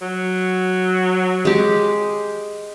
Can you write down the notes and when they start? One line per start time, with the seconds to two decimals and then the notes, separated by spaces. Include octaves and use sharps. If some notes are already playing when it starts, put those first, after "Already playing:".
0.02 F#3
1.45 G#3 G4